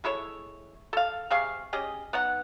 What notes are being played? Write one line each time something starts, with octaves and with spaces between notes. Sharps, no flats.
G#3 E4 A4 C#5
A4 F5
C3 G#4 F5 C#6
C#4 G4 G#4 D#5
B3 D#4 F#5